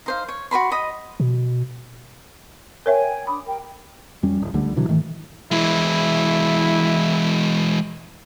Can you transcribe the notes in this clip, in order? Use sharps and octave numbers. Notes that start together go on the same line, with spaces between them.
D#4 C5 F5
C#5
F#4 B4 B5 C6
D#5 B5 D#6
B2
A#4 C#5 E5 G5 G#5
D4 B5 D6 D#6
G4 A#4 G5
F2 G3 C#4
D1
C#2 D3 G3 A3
B2 D3 E3 F#3
G#2 D#3 E3 A3
E3 G#3 E4